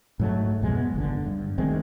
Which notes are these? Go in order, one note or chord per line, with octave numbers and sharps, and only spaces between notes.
G#2 F#3 A3
B1 F2 B2 G#3
B3
G1 C#2 D3
G2
D2 D#3 G#3 C4